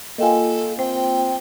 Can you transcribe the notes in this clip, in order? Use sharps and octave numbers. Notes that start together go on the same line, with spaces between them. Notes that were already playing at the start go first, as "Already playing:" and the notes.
A#3 F4 A4 D#5 G5 G#5
C4 C5 G5